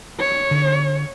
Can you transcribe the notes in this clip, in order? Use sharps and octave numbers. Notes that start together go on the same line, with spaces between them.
C#5
D3